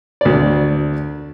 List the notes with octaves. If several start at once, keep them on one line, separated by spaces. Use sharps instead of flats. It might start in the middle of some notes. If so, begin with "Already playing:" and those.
D2 D5